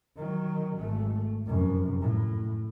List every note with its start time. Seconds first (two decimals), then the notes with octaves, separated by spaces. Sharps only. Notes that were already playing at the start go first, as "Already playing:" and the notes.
0.16 D#3 F#3
0.77 G#1 A3
1.47 F1 F#2
2.01 A2